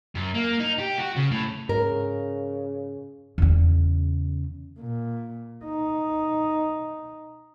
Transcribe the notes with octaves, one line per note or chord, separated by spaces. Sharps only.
F#2
A#3
D#4
G4
F#4
C#3
A2
G#2 C#3 A#4
E2 C#3
A#2
D#4